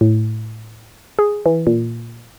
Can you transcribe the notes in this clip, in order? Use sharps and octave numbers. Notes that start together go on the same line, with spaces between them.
A2
G#4
E3
A#2